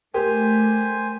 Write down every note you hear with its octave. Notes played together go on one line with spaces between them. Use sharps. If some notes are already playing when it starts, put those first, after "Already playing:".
A3 G4 A#4 C5 G#5